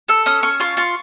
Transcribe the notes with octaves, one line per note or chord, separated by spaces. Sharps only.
A4 E6
C#4 D#6
C#4 C#6
F4 C#6
F4 C#6